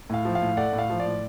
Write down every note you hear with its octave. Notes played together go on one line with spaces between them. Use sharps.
A2 F5
F3
F5
A2
A3 D5 F#5
A2
F5
F3
D5
A2